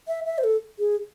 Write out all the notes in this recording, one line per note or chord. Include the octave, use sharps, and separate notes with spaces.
E5
E5
C5
A4
G#4